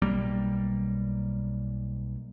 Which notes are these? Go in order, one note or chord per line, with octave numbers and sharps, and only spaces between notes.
B1 G3 A#3